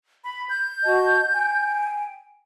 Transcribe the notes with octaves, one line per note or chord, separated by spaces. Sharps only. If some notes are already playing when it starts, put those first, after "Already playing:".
B5
G6
F#4 D#5 A5
G5 G#5